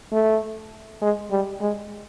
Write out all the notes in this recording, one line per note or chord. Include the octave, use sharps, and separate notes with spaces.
A3
G#3
G3
G#3